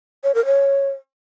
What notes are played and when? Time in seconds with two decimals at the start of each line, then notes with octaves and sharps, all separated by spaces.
0.24 C#5
0.35 A#4
0.46 C#5